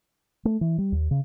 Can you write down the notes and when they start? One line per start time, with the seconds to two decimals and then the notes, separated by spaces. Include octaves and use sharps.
0.45 A3
0.61 E3
0.78 G3
0.92 D#2
1.11 C#3